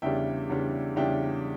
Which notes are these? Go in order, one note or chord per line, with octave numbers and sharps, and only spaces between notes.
E2 C#3 G3 D4 E5 G5
E2 C#3 G3 D4
E2 C#3 G3 D4 E5 G5